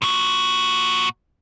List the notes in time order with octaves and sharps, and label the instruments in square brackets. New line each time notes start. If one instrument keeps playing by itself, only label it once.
[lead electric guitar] A#2 F#4